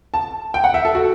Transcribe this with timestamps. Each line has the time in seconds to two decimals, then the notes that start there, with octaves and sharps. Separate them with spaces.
0.14 A5
0.54 G5
0.64 F#5
0.74 E5
0.85 A4
0.95 F#4